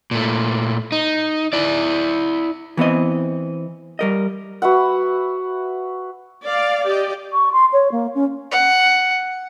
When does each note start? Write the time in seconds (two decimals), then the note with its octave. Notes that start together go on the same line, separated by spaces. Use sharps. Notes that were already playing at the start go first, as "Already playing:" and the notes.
0.11 A#2 A3
0.92 D#4
1.53 E4 D5
2.77 E3 B3 C4 D#5
3.99 G3 A#4 D#5
4.62 F#4 B4 E5 F#5
6.44 D5 F5
6.83 G4 D5 D#5
7.33 C#6
7.52 C6
7.73 C#5
7.92 A#3
8.15 C#4
8.51 F#5